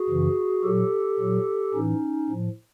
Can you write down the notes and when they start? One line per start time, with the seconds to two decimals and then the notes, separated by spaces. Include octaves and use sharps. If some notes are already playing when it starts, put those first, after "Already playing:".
Already playing: F#4 G#4
0.09 F#2 C#3 E3
0.63 A#2 F#3 G4 A4
1.19 A#2 F#3
1.74 A2 E3 C#4 D#4
2.29 A2 F3